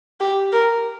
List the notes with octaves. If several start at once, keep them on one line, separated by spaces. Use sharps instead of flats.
G4
A#4